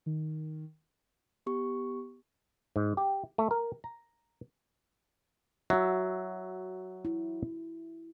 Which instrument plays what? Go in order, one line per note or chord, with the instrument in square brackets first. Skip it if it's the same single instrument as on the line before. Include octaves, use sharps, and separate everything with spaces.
[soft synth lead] D#3
[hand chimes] B3 G4 C#6
[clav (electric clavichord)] G#2
G4
A3
A#4
A#5
[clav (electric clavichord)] F#3 [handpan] F#4 E5
[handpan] E4